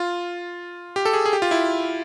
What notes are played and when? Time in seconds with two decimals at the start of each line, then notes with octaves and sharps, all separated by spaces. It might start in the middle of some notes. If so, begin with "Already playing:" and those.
Already playing: F4
0.96 G4
1.05 A4
1.13 G#4
1.26 G#4
1.33 G4
1.42 F4
1.51 E4